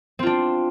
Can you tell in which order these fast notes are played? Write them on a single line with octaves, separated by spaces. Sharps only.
C4 F4 D4